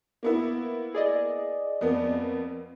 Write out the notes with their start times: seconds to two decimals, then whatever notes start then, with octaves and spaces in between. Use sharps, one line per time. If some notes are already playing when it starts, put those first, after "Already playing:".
0.23 A#3 B3 E4
0.94 G#4 D5 D#5
1.81 F2 A#3 B3